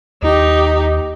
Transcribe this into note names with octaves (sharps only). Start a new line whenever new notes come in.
D#2 D#4 G4